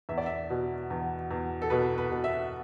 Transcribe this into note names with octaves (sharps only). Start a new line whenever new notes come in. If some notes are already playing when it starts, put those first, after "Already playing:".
E2 E5
D5
E5
B2
E2
E2
A4
B2 B4
B4
B2
E5